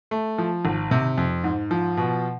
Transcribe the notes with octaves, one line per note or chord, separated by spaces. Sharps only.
A3
F3
G#1
C3
F2
G#2
F3
B2